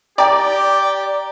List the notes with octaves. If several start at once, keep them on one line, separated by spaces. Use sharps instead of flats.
G4 D5 G5 A#5 D6